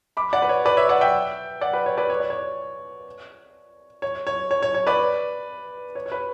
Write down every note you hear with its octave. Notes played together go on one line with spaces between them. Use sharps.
B5 D6
D5 F#5
B4
C#5
B4 D5
C#5 E5
D5 F#5
E5 G5
D5 F#5
B4
C#5
B4 D5
C#5
D5
C#5
C#5
C#5
C#5
C#5
C#5
B4 D5
C#5
C#5
B4